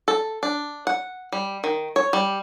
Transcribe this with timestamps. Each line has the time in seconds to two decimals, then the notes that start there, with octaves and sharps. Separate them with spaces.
0.08 A4
0.43 D4
0.87 F#5
1.32 G3
1.64 D#3
1.96 C#5
2.13 G3